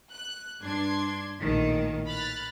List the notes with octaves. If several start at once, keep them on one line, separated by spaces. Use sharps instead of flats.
F#6
G2 D4 C6 G#6
A#1 A2 D#3
B5 F6 F#6 A6